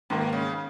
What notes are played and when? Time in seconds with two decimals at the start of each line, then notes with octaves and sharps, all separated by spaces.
0.10 G#2 B2 D#3 A#3
0.33 C#3